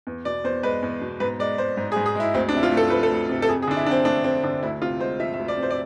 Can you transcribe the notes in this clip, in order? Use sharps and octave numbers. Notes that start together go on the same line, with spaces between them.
E2
B2 D5
E2 C5
G#3 B4
E2
B2
G#2 B4
G#3 D5
G#3 C5
G#2
G#4
G#2
G#4
G#3 E4
D2 C4
D4
C3 E4
F4
A3
A4
F3 B4
A4
D2
C3
A4
F2 G#4
G#4
D3 D4
E4
F2 C4 D4
A3 D4
F2 C4
D3 D4
D2 E4
C3 F4
G#3 C5
F3 E5
E5
D2
D5
C3
C5
D5